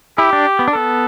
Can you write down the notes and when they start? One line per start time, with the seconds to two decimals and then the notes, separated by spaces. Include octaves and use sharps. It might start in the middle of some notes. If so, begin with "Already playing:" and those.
0.18 E4 G4
0.33 D4
0.59 B3
0.68 D4
0.73 B3 A4